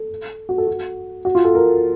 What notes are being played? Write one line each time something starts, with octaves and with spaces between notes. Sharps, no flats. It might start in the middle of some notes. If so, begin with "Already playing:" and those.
Already playing: A4
F#4
A4
F#4
F#4
F4
A4
A#4